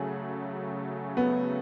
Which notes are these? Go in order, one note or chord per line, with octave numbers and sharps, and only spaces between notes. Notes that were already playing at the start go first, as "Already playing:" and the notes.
Already playing: C#3 F#3 A3 G#4
B3